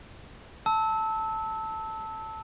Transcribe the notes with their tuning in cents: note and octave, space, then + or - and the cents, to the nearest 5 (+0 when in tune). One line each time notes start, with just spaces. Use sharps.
A5 +5 E6 -20